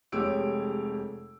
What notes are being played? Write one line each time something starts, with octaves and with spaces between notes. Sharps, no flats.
F1 G#3 G4 C#5 E6 D7